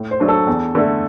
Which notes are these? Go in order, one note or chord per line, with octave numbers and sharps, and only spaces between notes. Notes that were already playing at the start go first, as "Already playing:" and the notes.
Already playing: A2
C5
F#3 A3 D4
A4
E2
D3 A3